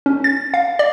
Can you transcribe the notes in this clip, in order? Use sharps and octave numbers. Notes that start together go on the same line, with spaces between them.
C#4
A6
F5
D5